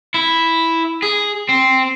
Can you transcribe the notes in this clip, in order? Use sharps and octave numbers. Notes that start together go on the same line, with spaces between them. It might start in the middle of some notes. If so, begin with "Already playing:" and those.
E4
G#4
C4